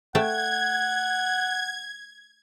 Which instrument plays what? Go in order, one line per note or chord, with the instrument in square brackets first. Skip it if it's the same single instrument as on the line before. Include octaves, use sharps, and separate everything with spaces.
[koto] A3 G5 A5 [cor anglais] F#5 [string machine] G#6